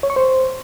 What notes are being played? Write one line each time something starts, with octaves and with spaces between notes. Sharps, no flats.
C#5
C#6
C5